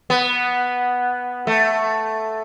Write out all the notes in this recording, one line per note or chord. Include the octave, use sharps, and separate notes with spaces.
B3
A3